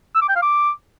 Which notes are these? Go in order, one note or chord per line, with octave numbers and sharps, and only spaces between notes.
E6
D6
G5
F5
D6